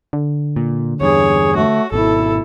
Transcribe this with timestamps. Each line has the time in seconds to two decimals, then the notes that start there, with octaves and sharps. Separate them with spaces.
0.13 D3
0.56 A#2
1.01 E2 G2 G#4 C#5
1.56 A3 F#4
1.92 G#1 B2 E4 A4